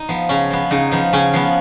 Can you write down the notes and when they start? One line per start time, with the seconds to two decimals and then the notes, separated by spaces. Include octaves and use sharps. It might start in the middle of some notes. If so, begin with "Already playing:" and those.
Already playing: D#4
0.09 F3 B3
0.29 C#3 C#4
0.50 F3 B3
0.71 C#3 D#4
0.91 F3 B3 D#4
1.13 C#3 C#4
1.34 F3 B3